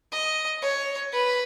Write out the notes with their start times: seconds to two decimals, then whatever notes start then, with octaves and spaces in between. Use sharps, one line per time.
0.12 D#5
0.62 C#5
1.13 B4